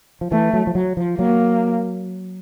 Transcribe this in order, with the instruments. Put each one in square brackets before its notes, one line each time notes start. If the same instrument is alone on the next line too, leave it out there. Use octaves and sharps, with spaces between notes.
[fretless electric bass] F3
[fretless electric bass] E3 [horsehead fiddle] A3
[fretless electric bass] F#3
F3
F#3
F3
[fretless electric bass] F#3 [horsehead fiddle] A#3